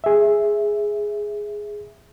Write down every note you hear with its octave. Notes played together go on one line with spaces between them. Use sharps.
G#4 E5